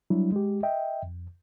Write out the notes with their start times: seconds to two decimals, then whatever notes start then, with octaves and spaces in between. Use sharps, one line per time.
0.10 F#3 G3 D4 E4
0.32 G#3 G4
0.63 D#5 E5 G5
1.03 F2